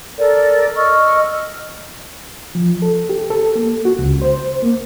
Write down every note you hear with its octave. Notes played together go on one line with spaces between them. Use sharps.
A4 A#4 D5
D#5 C#6 E6 F6
F3
A4
G4
A4
A#3
F#4
C#2
C5
A#3